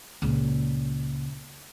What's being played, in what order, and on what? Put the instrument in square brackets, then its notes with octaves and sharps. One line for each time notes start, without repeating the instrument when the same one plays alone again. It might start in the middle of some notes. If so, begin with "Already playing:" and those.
[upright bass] C#2 A#2